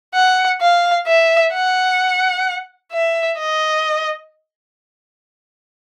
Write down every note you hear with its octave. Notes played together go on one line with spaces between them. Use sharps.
F#5
F5
E5
F#5
E5
D#5